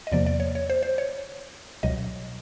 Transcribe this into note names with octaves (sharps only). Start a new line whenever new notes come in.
D#5
E2 C3 F3 A#3 D5
D5
C#5
C#5
C5
C5
C#5
C#2 B2 F#3 D#5